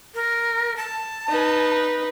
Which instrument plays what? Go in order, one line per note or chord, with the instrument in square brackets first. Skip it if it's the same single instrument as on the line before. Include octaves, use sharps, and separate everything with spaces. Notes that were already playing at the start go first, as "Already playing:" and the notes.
[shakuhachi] A#4
A5
[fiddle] D#4 B4